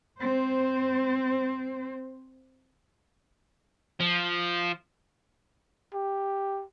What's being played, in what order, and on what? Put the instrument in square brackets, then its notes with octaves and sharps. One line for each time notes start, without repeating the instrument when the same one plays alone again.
[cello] C4 C5
[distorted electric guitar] F3
[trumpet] G4